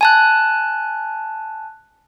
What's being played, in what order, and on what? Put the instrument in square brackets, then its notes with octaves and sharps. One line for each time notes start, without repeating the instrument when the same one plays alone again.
[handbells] G#5 A5 F#6